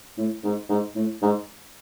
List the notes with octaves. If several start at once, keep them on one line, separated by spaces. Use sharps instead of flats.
A2
G#2
G#2
A2
G#2